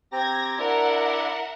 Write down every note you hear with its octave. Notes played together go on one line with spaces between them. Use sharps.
C4 G4 A#5 G#6 A#6
D4 E4 A#4 D5 E5 F#5